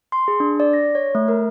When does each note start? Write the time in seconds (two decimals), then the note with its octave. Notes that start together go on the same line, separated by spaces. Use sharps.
0.12 C6
0.28 G#4
0.40 D4
0.60 D5
0.73 A#6
0.95 C#5
1.15 A3
1.28 A#4